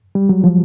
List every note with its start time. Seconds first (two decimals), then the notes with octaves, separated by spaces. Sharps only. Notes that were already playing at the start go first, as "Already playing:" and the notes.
0.15 G3
0.29 F#3
0.44 F3